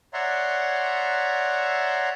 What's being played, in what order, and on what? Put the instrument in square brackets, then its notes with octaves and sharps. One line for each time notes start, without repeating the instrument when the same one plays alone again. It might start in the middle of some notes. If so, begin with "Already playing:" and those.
[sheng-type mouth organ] C#5 D5 E5 F#5 A#5 C6